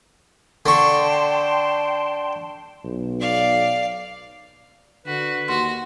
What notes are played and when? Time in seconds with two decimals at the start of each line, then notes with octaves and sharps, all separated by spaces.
0.66 D3 G5 A5 C6 C#6
2.84 B1
3.20 D5 F5
5.06 D3 F#4 B4
5.48 D#2 F#4 C6